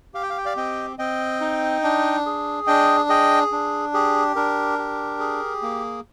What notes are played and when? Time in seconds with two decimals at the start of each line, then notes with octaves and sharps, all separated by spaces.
0.14 G4 F5
0.22 G5
0.30 F5
0.38 G5
0.45 D5 F5
0.56 C4 D#5 G5
0.99 C4 D#5 G5
1.41 D#4
1.84 D4
2.26 G#4
2.67 D4 D#5 G5
3.09 G#4 D#5 G5
3.52 D4
3.94 G4 G#4
4.36 D4 A#4
4.78 G4
5.20 G#4
5.62 A#3